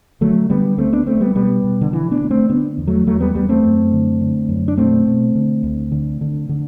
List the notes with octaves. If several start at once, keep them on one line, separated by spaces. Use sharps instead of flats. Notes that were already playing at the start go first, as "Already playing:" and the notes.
D3 F#3 A3
D3 G3 B3
D2 A3 C4
B3 D4
D2 A3 C4
G3 B3
B2 G3 B3
B2
D3
D3 E3
B3 D4
D2
A3 C4
D3 B3 D4
E2
F#3 A3
E2 F#3 A3
G3 B3
E2 G3 B3
A3 C4
F#2
D3
D3
F#2
D4
B2 A3 C4
B2
D3
D2
D3
D3
D3